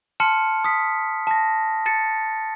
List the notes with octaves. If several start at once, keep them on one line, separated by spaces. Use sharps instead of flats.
A5 C6 F6 C#7
D#6 B6
A5 A#6
A5 A6 C#7